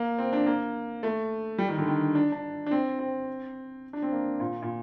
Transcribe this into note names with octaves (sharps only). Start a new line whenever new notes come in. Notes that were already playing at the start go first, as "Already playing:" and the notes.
Already playing: A#3
C4
D4
A#3
A3
G3
D#3
D3
D#3
D4
D4
D4
C4
C4
D4
C4
A#3
A#2
A#2